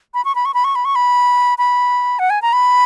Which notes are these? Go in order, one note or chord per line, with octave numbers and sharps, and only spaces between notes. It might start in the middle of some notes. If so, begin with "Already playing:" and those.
B5
C#6
B5
C#6
B5
C#6
B5
C#6
B5
B5
F#5
G#5
A#5
B5